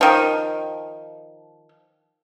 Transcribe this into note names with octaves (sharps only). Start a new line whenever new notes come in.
D#3 F3